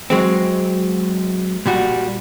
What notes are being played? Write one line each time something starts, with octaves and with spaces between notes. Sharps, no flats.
F#3 G#3 C4
A#2 G3 F#4